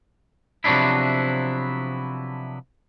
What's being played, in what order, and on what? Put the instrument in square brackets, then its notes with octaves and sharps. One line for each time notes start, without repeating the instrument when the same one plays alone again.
[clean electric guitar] C3 F3 F#3 B3 D4 E4